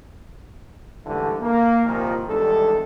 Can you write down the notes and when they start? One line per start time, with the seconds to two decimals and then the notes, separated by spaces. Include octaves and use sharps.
1.06 G#2 D3 E3 G3 A3
1.41 A#3
1.85 C2 A#2 D#3 F3 A#3 F4
2.27 E2 D#3 G3 G#3 D4 A4